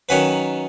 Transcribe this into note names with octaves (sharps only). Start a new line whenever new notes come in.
D#3 F#3 C#4 F#4 B4